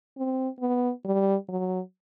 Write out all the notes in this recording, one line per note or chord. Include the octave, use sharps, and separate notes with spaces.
C4
B3
G3
F#3